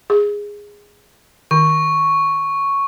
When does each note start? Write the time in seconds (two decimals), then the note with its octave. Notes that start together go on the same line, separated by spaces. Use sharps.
0.10 G#4
1.51 D#3 C#6